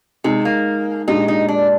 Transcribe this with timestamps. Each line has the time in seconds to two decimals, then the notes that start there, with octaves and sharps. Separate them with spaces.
0.24 C3 G#3 D#4 G#4
0.45 A#3
1.07 A#2 G#3 D4 D#4 G4
1.28 D#4
1.48 D4